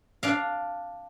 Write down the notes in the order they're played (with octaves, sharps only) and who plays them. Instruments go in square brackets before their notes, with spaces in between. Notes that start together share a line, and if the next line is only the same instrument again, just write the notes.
[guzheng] D4 D5 F5